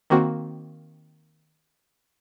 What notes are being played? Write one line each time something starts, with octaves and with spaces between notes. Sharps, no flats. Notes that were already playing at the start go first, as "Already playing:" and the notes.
D#3 A#3 C4 F#4